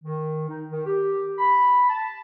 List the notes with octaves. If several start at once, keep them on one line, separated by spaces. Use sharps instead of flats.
D#3
D#4
D#3
G4
B5
A5